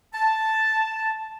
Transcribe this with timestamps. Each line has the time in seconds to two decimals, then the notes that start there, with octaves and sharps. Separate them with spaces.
0.14 A5